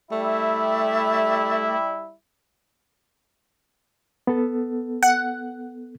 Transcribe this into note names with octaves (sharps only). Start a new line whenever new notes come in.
G3 A3 E4
B3 A4
F#5